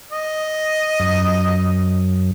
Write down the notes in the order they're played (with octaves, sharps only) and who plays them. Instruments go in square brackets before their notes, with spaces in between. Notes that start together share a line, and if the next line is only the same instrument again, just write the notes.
[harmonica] D#5
[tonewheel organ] F#2